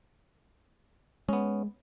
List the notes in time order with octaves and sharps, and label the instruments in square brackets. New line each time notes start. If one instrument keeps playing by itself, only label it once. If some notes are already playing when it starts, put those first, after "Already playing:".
[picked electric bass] G#3 [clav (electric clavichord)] B3 C#4